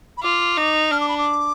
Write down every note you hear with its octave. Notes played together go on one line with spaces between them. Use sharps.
B5
F4 D6
D#4
D4 F6
D6
B5
D6